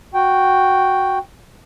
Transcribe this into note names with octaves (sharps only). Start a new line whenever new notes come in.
F#4 G5